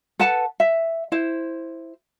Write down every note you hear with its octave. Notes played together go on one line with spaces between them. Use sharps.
A4 B4 F#5 A5
E5
E4 C5